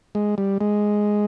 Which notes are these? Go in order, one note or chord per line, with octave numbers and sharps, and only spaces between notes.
G#3
G3
G#3